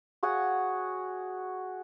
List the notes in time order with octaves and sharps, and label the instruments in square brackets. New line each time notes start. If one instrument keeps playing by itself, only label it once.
[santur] F#4 G#4 C#5 F#5